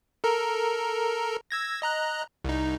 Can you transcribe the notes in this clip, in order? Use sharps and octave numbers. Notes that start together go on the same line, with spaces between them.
A4 A#4 A#5
E6 G#6 A#6
D#5 A#5 F#6
C2 D#4